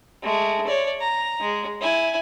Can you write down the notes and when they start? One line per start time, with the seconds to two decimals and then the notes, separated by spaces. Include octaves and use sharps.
0.23 G#3 A3
0.67 C#5 D5
1.00 A#5
1.40 G#3
1.81 E4 G#5